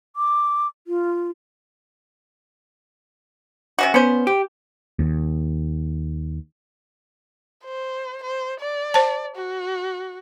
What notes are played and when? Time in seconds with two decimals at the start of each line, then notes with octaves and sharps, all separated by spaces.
0.16 D6
0.87 F4
3.79 C3 C#4 F#4
3.94 B3 C#4 C5
4.27 G4
4.99 D#2
7.65 C5
8.23 C5
8.60 D5
8.94 C5 A5
9.36 F#4